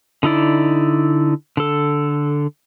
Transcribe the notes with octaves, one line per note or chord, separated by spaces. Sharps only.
D3 D#4 E4 D5
D3 A4